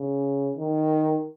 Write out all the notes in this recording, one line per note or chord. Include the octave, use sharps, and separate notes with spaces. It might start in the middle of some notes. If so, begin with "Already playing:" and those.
Already playing: C#3
D#3